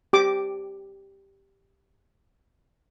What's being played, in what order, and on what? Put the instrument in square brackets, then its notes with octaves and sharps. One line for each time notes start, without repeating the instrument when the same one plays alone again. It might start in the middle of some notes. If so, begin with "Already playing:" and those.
[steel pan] G4 D6